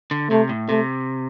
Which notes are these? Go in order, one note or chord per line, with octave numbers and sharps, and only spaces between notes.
D3
C3 A3
A2
C3 A3